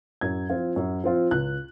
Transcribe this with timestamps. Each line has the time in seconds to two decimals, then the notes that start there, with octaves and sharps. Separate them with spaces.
0.21 F#2 G#6
0.50 F3 C4 F4
0.76 F#2
1.04 F3 C4 F4
1.31 C#2 F#6